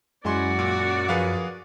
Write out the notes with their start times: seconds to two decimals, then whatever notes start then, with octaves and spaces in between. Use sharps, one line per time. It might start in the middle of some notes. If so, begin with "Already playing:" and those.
0.25 F#2 F#3 G#3 E4 F#4 D5 G#5 C6
0.59 A#2
1.09 F3 G#4 A#4 B4 F5 D#6